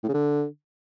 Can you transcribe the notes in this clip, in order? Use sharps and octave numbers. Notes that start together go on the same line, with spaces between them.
A2
C#3
D3